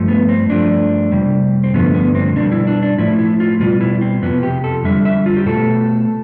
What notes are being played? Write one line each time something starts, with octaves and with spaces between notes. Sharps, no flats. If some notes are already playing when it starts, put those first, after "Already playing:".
Already playing: G2 F3 A3
B3
C4
G2 F3 A3 D4
F2 C3 G3
C4
G2 D3 F3 A3 B3
B3
C4
B2 G3 D4
E4
D4
D4
A2 F3 A3 E4
E4
F4
B2 G3 F4
E4
C4
F2 C3 F3 B3
G4
A4
F2 D3 G3 E5
E5
F4
G4
B2 A3 A4